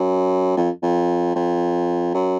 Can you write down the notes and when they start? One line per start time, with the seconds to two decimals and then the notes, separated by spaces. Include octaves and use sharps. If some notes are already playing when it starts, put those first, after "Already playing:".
Already playing: F#2
0.57 F2
0.82 F2
1.35 F2
2.14 F#2